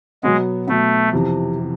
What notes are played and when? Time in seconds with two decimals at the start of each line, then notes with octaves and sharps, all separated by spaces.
0.23 B2 F#3 G#3 B3
0.68 B2 F#3 A3 B3
1.13 F2 C3 E3
1.60 C3